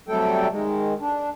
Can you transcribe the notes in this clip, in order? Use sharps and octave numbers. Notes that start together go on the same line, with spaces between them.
C3 F#3 G3 A3 A4 G5
D#3 G#3
D4